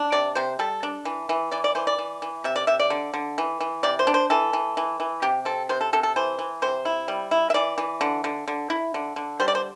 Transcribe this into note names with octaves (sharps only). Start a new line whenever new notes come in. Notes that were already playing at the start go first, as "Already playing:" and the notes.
Already playing: D4
C3 D5
C3 C5
G3 A4
D4
E3
E3
E3 D5
D5
E3 C5
D5
E3
E3
C3 E5
D5
C3 E5
D5
D3
D3
E3
E3
C3 D5
C5
D4
C5
E3 A4
E3
E3
E3
C3 G4
C4 A4
C3 C5
A4
C3 A4
A4
E3 C5
E3
C3 C5
E4
G3
E4
E5
E3 D5
E3
D3
D3
D3
E4
D3
D3
G3 C5
D5
C5